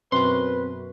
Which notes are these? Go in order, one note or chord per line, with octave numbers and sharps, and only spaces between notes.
F#2 B2 C4 F#4 B4 C6